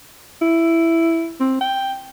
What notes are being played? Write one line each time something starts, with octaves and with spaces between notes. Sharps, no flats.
E4
C4
G5